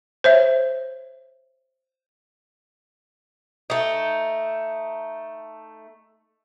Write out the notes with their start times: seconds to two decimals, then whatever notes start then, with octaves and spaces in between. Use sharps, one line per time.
0.24 C5 C#5 E5
3.70 A3 D#4